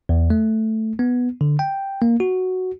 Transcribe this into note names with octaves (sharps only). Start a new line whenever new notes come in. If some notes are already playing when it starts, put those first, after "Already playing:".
E2
A3
B3
D3
G5
A#3
F#4